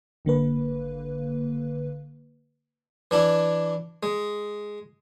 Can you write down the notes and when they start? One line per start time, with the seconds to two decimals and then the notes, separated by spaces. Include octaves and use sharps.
0.25 G#1 D3 A#3 B4
3.11 E3 D4 E4
4.03 G#3